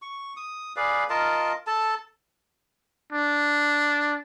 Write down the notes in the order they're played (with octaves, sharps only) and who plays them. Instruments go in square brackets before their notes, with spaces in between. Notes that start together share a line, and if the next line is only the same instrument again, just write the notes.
[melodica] C#6
D#6
G#4 B4 D5 F5
F4 A#4 D#5 A5
A4 A5
[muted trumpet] D4